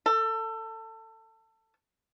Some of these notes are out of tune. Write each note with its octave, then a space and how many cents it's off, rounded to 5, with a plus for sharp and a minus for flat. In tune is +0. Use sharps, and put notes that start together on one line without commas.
A4 +25